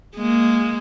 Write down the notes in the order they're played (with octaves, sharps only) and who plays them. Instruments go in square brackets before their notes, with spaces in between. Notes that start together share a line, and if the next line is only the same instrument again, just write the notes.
[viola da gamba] G#3 A#3